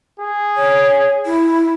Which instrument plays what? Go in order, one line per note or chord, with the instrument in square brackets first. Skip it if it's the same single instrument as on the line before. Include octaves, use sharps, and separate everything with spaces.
[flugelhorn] G#4
[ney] C#5
E4